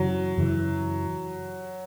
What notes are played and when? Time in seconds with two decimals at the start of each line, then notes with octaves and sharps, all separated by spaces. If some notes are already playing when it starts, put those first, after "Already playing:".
Already playing: F#2 C#3 E3 F#3
0.38 F#2 C#3 E3